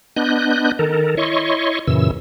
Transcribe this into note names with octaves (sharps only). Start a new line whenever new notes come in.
B3 D4 D#5 F#6 G6
D#3 A4 A#4
E4 C#5 D#5 C6 C#6
F#2 A#2 C#3 E3 E6